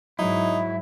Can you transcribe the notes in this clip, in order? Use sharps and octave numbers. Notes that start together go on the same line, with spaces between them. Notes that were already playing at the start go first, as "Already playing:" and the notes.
G#2 F#3 D#4 E4